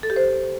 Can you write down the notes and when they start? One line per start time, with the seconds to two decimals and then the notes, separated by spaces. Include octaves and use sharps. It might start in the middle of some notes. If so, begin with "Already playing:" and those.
0.03 A4
0.10 G4
0.16 C5